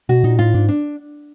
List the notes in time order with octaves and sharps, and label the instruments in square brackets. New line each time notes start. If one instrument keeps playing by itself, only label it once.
[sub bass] B2 [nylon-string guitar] F#4
[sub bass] A#2 [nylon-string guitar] D#4
[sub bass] A2 [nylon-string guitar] F4
[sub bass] G#2 [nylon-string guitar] D4
[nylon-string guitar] D4